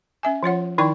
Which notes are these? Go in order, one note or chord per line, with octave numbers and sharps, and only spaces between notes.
C#4 E5 G#5
F3 F4 C#5 F#5
D#3 D#4 E4 D5 G5 C#6